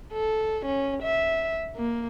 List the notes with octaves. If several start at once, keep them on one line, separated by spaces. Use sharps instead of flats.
A4
C#4
E5
A#3